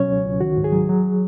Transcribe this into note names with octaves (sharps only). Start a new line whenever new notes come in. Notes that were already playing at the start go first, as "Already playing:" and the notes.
Already playing: B2 F#3 C#4 C#5
C#2
C#2
D#3 F#4
G#2
G#4
F#3
F#3